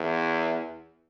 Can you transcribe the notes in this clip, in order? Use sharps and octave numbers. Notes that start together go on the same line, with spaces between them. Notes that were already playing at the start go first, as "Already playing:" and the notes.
Already playing: E2